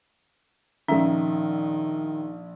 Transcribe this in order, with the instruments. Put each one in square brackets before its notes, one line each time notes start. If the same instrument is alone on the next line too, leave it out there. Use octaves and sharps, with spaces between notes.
[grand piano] A#1 E5 [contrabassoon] D#3 [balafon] C#4